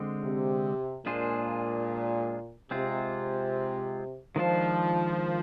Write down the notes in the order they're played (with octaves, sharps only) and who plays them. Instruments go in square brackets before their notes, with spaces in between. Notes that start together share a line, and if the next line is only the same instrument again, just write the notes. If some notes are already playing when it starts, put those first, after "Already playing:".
Already playing: [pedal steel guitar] D3 G#3 C4
[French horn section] C3
[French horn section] A#2 [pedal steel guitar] G#3 D4 F4 G#4 C5
[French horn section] C3 [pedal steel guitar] G#3 C4 F4
[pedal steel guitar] D#3 G#3 D4 F4 C5 [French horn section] F3